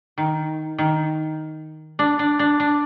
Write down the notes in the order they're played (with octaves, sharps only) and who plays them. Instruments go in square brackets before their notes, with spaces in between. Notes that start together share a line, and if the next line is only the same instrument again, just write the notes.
[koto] D#3
D#3
D4
D4
D4
D4